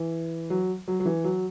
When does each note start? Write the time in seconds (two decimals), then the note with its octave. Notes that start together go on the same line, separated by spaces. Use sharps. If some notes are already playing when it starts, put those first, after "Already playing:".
Already playing: E3
0.50 F#3
0.88 F#3
1.00 F#3
1.06 E3
1.24 F#3